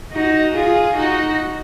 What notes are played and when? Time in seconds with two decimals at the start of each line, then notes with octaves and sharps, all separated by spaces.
0.13 D#4 F#4
0.55 F4 G#4
0.96 D#4 F#4